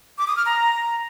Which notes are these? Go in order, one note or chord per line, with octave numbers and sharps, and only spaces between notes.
D6
D#6
F6
A#5